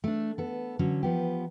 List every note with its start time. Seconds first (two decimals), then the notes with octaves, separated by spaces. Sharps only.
0.04 A3 D4
0.38 B3 A4
0.79 D3 F#3 C#4
1.03 F3 B3 G4